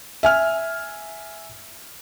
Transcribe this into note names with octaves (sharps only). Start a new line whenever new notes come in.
E5 G#5 F6